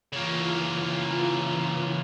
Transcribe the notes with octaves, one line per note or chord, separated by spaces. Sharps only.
C#3 E3 A#3 F4